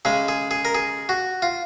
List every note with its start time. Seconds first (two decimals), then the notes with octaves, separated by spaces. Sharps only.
0.05 C#3 G#3 G#4
0.28 G#4
0.51 G#4
0.65 A#4
0.75 G#4
1.09 F#4
1.42 F4